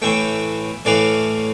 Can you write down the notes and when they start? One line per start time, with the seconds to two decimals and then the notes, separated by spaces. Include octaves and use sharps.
0.02 A2 E3 A3 E5 G5
0.85 A2 E3 A3 D5 F5